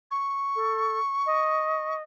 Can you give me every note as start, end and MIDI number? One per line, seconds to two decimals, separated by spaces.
0.11 1.95 85
0.56 0.99 69
1.26 2.03 75